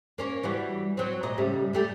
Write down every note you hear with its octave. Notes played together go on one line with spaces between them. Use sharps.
A#3 C#4 C#5
E3 G3 F#4
F#3 C4
A#2 D#5
A2 C#3 G3
G3 A3 G4